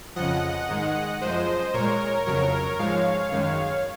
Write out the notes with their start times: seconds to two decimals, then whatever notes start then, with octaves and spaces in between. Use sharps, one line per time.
0.16 F2 C#3 F3 D#5 F#5
0.69 G#2 D#3 G#3
1.21 F#2 F3 G#3 C5 D#5
1.74 A#2 G#3 A#4 C#5
2.26 F2 C#3 F#3 A#4 C#5
2.79 G#2 F3 G#3 C#5 F5
3.32 F#2 D#3 G#3